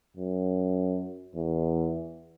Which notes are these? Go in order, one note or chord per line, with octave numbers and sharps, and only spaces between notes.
F#2
E2